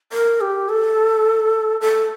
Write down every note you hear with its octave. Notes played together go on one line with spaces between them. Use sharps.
A#4
G4
A4
A4